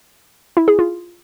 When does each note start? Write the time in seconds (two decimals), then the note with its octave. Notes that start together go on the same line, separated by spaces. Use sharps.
0.57 E4
0.68 G#4
0.79 F4